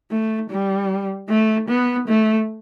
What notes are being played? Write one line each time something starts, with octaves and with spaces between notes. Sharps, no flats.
A3
G3
A3
B3
A3